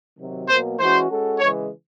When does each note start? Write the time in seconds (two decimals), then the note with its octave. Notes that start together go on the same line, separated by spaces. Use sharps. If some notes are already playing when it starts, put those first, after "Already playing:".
0.19 C3 D#3 F#3
0.49 B2 F#3 A#3 C5
0.79 E3 G#3 C#4 F#4 C5
1.09 G#3 C#4 F#4 A4
1.39 C#3 E3 G#3 C#5